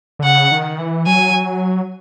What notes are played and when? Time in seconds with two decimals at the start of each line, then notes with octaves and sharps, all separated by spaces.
0.19 D3
0.23 C#3 F#5
0.52 D#3
0.79 E3
1.06 F#3 G#5